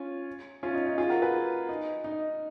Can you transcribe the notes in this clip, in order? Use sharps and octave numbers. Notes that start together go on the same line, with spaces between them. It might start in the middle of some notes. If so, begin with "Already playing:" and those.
Already playing: C#4 F4
C#4 F4
D#4
D#4
F4 G#4
F#4 A#4
G#4 B4
D#4
D#4